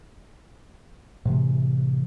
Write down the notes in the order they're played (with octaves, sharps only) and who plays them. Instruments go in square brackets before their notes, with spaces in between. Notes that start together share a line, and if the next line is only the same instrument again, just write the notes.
[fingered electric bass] A2 C3 E3